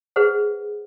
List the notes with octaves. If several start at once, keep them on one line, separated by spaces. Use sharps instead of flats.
G#4 B4 C5 F#5